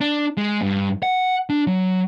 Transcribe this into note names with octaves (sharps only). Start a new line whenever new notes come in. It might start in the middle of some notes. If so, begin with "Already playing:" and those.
D4
G#3
G2
F#5
D4
F#3